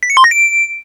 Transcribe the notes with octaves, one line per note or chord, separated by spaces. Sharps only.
B6
C#7
C6
A#6
D7